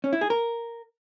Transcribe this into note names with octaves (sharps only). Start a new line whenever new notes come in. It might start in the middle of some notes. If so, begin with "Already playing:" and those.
C#4
E4
G#4
A#4